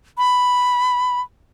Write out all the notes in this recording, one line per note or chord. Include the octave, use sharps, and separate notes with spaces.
B5